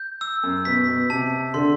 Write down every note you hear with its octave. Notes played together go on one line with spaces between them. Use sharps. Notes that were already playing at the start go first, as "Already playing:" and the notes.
Already playing: G6
E6
F#2
B2 B6
B2
C3 A5
D3 C6